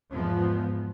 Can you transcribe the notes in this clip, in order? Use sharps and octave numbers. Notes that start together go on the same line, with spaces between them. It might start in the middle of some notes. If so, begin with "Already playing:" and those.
E2 G#2 F3 B3